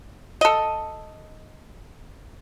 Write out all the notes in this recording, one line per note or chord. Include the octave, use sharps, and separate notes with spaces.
A4 D#5